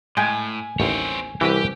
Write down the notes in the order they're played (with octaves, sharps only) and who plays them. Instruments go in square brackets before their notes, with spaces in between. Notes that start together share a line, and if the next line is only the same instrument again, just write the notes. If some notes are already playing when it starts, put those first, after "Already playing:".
[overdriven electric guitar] A2 [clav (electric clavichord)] G#3 G5 [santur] G#5
[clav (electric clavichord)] A1 D#2 [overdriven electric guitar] C4 C#5
[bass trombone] C2 [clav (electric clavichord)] E3 F#4 B4 [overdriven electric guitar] G4 G5